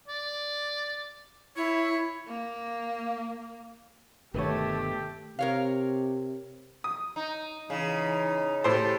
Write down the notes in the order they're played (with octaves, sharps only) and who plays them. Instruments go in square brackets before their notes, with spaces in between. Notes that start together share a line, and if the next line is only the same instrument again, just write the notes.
[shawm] D5
[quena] E4 [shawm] C#5
[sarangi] A#3
[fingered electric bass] G1 B2 D#3 [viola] A3 [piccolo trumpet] G4 [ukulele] B4 C#5
[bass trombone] C3 [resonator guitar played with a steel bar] A#4 C#5 F5
[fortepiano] D#6
[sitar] D#4
[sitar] C#3 [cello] E3 D#4
[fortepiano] A2 C5 [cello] G4 A4